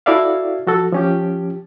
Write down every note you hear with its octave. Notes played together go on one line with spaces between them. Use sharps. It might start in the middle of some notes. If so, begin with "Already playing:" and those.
E4 F#4 A4 D5 E5 F5
F3 F#4 A4
F3 C#4 G4